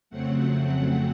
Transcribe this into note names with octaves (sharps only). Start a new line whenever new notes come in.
F2 C#3 F#3 A3 C4 F#5